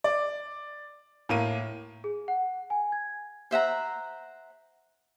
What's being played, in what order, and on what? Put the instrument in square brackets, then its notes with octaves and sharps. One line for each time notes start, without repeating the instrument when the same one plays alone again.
[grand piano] D5
A2 A#3 D#7
[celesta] G#4
F#5
G#5
G#6
[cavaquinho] C5 E5 F#5 A#5